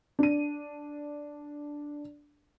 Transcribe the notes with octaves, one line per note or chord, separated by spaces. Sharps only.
D4 D#7